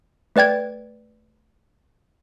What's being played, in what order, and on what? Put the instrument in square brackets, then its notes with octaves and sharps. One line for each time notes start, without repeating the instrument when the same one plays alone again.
[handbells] A3 B4 D5 G5 G#6